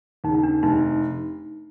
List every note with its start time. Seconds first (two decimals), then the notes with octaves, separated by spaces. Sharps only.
0.24 D#2 D#4
0.28 C#3
0.34 D#4
0.43 D4
0.63 F1 D#4